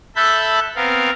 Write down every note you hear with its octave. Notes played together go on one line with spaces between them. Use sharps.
A4 E5 A5 B5 F#6 G6
B3 C4 A#4 F5